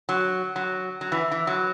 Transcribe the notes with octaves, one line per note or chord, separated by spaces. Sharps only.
F#3
F#3
F#3
E3
E3
F#3